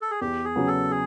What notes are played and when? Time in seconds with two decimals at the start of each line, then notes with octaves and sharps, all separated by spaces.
0.02 A4
0.11 G#4
0.21 E2 G4
0.45 G#4
0.56 C#3 F#3 B3
0.67 A4
0.91 G#4